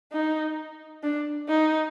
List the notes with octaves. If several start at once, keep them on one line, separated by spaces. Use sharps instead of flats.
D#4
D4
D#4